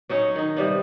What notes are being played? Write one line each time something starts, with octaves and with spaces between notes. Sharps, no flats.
F#3 C#4 D#4 C#5
D#3 D#4
C3 G3 B3